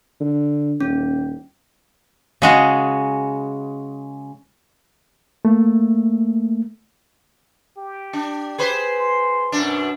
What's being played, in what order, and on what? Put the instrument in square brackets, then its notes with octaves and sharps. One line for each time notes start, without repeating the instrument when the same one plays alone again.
[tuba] D3
[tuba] D#1 [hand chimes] C#4
[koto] C#3 G#3 F#4
[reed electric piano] A3 A#3
[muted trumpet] G4
[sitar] D4
G#4 B4 C5
[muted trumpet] C6
[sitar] F#2 B2 D4